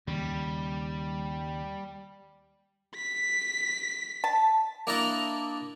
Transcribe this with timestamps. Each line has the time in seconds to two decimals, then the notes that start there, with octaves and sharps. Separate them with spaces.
0.07 D#2 C#3 G3
2.96 B6
4.24 A5
4.87 A#3 D4 E4 D#5 A5 A#5